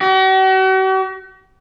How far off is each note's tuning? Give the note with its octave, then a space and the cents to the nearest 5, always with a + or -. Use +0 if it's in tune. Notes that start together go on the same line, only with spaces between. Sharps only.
F#4 +45